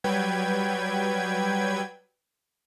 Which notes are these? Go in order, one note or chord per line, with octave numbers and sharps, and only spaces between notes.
F#3 G3 B4 G5 G#6